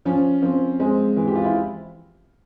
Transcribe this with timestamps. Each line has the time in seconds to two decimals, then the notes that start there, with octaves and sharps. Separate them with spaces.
0.05 F3 C#4
0.42 F3 C4
0.80 G#3 C4
1.17 E3
1.27 G4
1.35 F4
1.44 E4